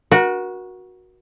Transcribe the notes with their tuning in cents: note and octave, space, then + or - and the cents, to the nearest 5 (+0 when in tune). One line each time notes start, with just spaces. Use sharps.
F#4 -5 A#4 +40